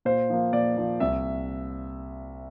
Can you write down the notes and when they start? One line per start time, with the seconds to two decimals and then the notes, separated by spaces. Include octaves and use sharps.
0.05 A#2 C5
0.30 F3 A#3
0.53 A#2 D5
0.77 F3 A#3
1.00 C2 E5